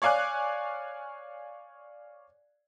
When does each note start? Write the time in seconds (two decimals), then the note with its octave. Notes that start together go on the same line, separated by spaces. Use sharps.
0.02 C#5 D5 F5 G#5 D6 F#6